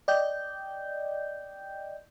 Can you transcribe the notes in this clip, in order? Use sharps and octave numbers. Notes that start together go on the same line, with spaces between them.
D5 D#5 G5 G6